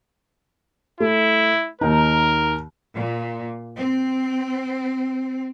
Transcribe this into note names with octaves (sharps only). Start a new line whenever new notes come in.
A3 E4
D#2 D#4 A#4
A#2
C4